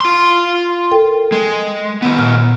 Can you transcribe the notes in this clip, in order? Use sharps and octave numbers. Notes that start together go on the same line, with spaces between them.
F4 C6
A4 A#4 G5
G#3
D#3 B3
A#2 F6